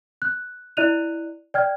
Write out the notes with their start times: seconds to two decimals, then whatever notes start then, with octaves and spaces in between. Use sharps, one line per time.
0.22 F#6
0.77 E4 D5 D#5 F#6 D#7 F7
1.54 D5 G5 F6 G#6